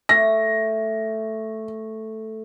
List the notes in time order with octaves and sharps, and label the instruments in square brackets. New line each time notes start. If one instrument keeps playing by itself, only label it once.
[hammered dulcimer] A3 [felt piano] A#6